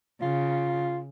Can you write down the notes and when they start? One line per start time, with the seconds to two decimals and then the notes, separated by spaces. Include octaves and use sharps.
0.22 C#3 F4